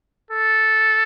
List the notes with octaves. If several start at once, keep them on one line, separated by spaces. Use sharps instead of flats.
A4